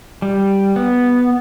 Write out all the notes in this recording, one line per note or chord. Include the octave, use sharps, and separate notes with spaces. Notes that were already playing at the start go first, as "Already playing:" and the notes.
G3
B3